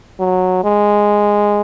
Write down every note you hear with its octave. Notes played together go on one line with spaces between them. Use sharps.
F#3
G#3